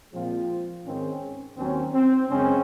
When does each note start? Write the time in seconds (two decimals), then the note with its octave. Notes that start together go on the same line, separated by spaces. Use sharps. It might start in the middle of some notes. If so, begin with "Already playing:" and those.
0.12 A#2 F3 G#3 C4 F4
0.85 G#2 D#3 G#3 C4 C#4
1.57 D#2 D#3 F#3 C4 C#4
1.93 C4
2.29 F#2 C#3 G#3 C4 C#4